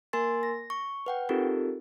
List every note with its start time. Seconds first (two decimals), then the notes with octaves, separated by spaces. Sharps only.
0.13 A#3 A#4 G#5 C6 A6
0.43 A#6
0.70 C#6
1.06 B4 F#5 G5
1.29 C4 D#4 F4 G4 A4 A#4